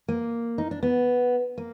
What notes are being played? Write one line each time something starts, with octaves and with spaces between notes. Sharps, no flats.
A#3
D#4
D4
B3
A#3